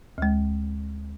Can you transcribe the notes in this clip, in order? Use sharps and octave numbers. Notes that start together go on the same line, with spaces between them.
D2 G#3